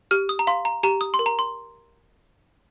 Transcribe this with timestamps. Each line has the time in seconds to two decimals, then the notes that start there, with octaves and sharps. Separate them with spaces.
0.11 G4 F6
0.29 D#6
0.39 A#5
0.47 F5 C6
0.65 A#5
0.83 G4 A#5
1.01 D#6
1.14 C6
1.19 A#4
1.26 A#5
1.39 C6